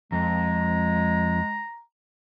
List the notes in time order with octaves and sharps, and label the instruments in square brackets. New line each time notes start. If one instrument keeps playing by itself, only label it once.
[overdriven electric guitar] F2 [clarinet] G#3 [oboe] A#5